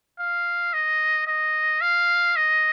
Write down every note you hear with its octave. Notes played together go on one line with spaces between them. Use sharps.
F5
D#5
D#5
F5
D#5